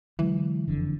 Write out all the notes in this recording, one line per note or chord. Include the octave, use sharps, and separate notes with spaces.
D3 E3 F#3 G#3
F#1 F2 D3